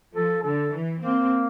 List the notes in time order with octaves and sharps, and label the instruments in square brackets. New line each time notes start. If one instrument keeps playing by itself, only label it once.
[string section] F3 [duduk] A4
[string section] D3 [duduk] A4
[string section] E3
[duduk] A#3 [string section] C4